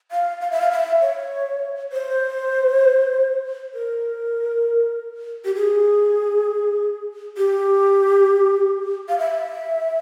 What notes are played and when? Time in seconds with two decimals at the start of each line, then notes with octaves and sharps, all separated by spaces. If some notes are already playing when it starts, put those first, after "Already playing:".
0.12 F5
0.41 F5
0.51 E5
0.61 F5
0.71 E5
1.02 C#5
1.92 C5
3.74 A#4
5.45 G4
5.55 G#4
7.37 G4
9.09 F5
9.19 E5